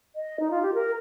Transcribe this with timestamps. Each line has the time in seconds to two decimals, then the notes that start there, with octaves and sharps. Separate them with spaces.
0.16 D#5
0.40 D#4
0.51 F4
0.62 G4
0.74 A#4